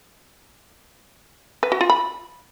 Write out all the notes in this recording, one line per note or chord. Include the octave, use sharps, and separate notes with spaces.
B4
F#4
F4
B5